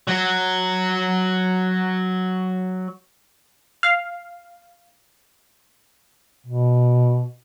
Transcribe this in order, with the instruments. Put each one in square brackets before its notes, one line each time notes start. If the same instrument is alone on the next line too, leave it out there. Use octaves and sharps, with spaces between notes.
[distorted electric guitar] F#3 F#4
[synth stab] F5
[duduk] B2